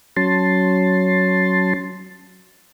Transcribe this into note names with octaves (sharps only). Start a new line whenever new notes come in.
F#3 C#4 A5 C6